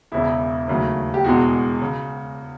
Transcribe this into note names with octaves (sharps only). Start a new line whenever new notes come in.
E1 E2 C#3 E4
D#2 C#3 F#3 A3
G4
E1 E2 B2 G#3 F#4
C#3